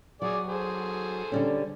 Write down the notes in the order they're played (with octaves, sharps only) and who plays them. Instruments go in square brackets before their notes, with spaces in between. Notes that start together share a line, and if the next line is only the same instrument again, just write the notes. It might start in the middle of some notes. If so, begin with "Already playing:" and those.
[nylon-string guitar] F#3 [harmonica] G#4 D5
[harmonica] G#4 A4 C5
[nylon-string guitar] D3 G3 C#4